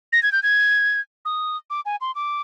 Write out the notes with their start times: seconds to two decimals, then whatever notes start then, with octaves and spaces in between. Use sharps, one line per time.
0.12 A#6
0.23 G#6
0.32 G6
0.43 G#6
1.25 D#6
1.70 D6
1.85 G#5
2.01 C6
2.15 D6